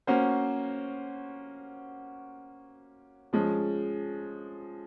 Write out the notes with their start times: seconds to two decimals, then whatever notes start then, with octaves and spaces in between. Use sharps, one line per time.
0.07 A#3 C#4 F#4 C5
3.33 F3 G#3 C#4